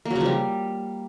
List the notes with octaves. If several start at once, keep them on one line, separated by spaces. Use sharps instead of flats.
A#3
F#3
C#3
F3
G3